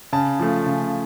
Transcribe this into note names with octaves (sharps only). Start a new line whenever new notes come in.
C#3 A5
F3 A3
C#3